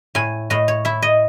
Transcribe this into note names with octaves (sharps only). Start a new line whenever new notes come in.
A2 G#5
A2 D#5
C#5
E4 E5
D#5